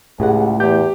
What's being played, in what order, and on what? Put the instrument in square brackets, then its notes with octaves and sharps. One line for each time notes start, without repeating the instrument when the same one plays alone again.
[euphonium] C#2 [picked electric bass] A2 [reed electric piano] G4 G#4 F#5
[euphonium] E2 [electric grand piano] G4 [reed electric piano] G6